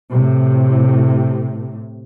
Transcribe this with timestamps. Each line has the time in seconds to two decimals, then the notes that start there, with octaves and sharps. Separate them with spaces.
0.11 A2 C3